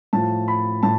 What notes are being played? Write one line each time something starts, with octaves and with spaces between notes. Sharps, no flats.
A2 F3 A5
B5
A2 A5